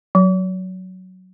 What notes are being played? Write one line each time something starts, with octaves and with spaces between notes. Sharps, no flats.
F#3